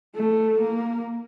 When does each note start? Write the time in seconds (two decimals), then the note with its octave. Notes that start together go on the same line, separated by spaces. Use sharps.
0.15 A3
0.60 A#3